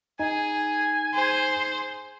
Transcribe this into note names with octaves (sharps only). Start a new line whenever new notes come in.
D#4 G#4 G#5
G#4 C5